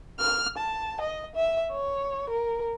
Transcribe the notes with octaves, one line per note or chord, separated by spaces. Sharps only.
F6
A5
D#5
E5
C#5
A#4